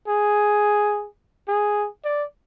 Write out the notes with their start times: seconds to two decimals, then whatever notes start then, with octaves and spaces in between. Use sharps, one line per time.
0.08 G#4
1.48 G#4
2.04 D5